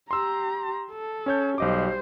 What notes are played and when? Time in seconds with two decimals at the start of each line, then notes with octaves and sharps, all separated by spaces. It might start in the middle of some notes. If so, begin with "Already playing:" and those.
0.11 G4 A#5 C6 E6
0.92 A4
1.26 C#4 C#5 G6
1.58 B1 G3 C5 D#5 D6